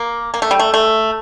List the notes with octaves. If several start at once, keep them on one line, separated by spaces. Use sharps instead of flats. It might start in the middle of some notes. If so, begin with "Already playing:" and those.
Already playing: A#3
A#3
A3
G3
A3
A3